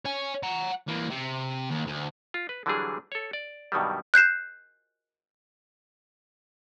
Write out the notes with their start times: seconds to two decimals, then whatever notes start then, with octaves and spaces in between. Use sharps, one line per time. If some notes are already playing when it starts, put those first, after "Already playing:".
0.05 C#5 G#5
0.43 F#5 A#5
0.88 E3 A#3
1.10 C3
1.70 D#2
1.86 D2
2.34 F4
2.49 B4
2.66 D3 E3 F#3 G3 D4 G#4
3.12 A4 C#5
3.33 D5
3.72 G2 B2 D#3 F#3 G3
4.14 F#6 G6 C7 E7